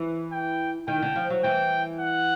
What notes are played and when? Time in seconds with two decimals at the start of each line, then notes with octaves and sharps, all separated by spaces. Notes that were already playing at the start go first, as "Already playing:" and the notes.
Already playing: E3
0.32 G5
0.88 D#3 G5
1.02 D3
1.16 F3
1.30 F#3
1.44 E3 G5
2.00 F#5